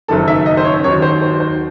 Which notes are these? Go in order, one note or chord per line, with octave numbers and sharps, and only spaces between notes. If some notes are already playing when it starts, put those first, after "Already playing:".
F#1 F#2 D#3 A4
E5
D#5
C5
C#5
D#2 D#3 F#3 C#5
C5
C5
C5